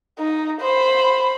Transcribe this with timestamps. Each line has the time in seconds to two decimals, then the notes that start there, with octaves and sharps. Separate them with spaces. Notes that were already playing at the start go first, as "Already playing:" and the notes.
0.19 D#4
0.61 C5 B5